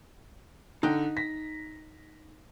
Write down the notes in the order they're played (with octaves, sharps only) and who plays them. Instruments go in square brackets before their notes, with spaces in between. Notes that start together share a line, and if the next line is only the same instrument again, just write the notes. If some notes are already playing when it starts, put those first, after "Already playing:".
[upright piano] D3 [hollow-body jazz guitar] D#4 G5
[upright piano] A#6 B6